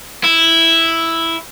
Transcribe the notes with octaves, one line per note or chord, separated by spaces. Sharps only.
E4